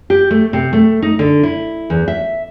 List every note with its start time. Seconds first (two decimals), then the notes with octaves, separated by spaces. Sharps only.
0.10 G4
0.31 A3
0.53 C3
0.73 A3
1.02 D#4
1.19 D3
1.43 E4
1.90 E2
2.08 E5